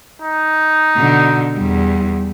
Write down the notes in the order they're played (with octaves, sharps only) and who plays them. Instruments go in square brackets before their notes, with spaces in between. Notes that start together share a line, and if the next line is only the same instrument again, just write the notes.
[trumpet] D#4
[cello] B2 D3
E2 G3